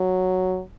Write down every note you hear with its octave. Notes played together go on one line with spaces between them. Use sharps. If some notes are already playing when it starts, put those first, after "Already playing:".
Already playing: F#3